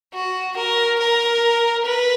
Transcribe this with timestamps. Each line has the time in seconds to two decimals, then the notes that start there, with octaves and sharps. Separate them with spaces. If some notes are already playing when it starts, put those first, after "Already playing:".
0.14 F#4
0.57 A#4
0.99 A#4
1.86 B4